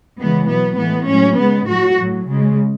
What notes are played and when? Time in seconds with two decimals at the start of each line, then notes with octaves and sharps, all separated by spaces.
0.19 C#3 E3 G#3 B3
0.49 B2 F#3 B3
0.79 A2 E3 G#3 B3
1.09 A2 F#3 C#4
1.39 C#3 G#3 B3
1.68 A2 F#3 F#4
1.98 A2 F#3
2.28 C#3 G#3